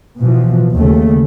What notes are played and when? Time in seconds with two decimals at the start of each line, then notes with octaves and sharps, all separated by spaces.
0.18 B2 E3 F3
0.75 D#2 C#3 A3